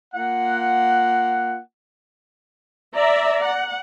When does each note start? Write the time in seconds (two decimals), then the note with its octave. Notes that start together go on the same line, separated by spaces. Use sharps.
0.14 A#3 F4 F#5
2.93 D5 E5 A#5
3.42 F#5